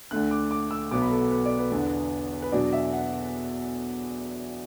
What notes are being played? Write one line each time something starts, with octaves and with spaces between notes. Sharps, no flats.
D2 D3 A3 D4 F#6
D6
D6
E6
B1 B2 B3 D6
B5
A4
A4
B4
D5
B4
E2 D3 B3 D4
B4
E2 B2 F#3 D4 D5
E5
F#5